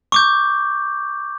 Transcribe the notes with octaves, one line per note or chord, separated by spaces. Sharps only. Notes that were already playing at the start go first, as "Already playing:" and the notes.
C#6 D6 G6